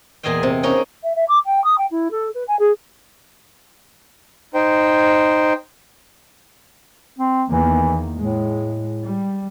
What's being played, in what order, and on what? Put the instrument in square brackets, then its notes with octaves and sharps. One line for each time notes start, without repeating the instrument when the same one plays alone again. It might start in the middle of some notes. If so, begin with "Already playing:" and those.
[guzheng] E2 A#2 G#4 D#5 F5 G5
C3
A#3 C#4 D#4 A#4
[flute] E5
E5
D6
G5
D#6
G5
E4
A4
B4
G#5
G#4
[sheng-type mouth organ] D#4 C5 G5
[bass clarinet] C4
[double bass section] E2 D#3 A#3 [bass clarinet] E3
[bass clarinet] A2 [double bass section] G#3
[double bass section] G3